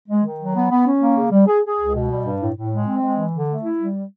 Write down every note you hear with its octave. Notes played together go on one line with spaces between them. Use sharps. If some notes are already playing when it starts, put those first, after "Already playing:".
G#3
D#3
F#3
B3
B3
C#4
A#3
C#3
G3
G#4
G#4
C#2
B2
G3
G2
A2
A2
G#3
C4
G#3
E3
D3
A3
E4
G3